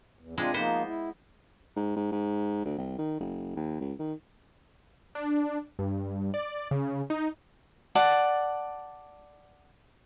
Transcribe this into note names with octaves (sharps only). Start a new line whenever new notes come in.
E2
C3 G#3 C4 D4 F4
F3 A#3 B3 D#4 C5
E4
G#2
G#2
G#2
D2
C2
D#3
F#1
D#2
C#2
D#3
D4
G2
D5
C#3
D#4
D5 F#5 A5